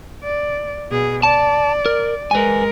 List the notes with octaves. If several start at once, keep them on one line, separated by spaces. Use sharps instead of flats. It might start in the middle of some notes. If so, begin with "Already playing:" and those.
D5
B2 G#4
D5 A5
A#4
G#3 A#4 B4 G#5